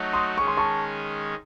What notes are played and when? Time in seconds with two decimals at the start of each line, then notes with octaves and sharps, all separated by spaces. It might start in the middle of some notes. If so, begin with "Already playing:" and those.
Already playing: F#3 A3 D#4 F#4
0.13 C6 D#6
0.37 D#3 G#3 C#4 C#6
0.47 C6
0.57 A5 C#6